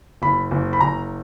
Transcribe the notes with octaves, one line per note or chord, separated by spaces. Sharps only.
F#1 B5
F#1
B5
F#1 A#5